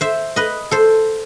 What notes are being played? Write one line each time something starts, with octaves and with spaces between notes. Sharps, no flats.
C5 E5
B4 D#5
A4 C5